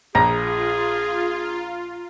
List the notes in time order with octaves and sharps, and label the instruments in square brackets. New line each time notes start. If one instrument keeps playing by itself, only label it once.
[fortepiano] A#1 [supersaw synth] F4 [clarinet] G#4 [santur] A#5